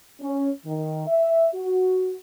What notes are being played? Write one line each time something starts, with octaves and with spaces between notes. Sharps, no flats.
C#4
D#3
E5
F#4